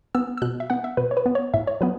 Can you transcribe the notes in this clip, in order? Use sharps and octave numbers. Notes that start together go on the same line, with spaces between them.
B3 E6
E6
B2 F#6
E5
B3 F#5
E5
B2 B4
C#5
B4
B3
C#5
A2 E5
C#5
F#3 B3 B4